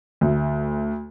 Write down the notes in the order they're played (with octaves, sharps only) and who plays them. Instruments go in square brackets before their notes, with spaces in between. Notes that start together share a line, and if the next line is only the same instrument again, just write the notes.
[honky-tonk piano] D2